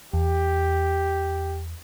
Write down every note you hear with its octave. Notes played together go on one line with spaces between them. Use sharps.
E2 G4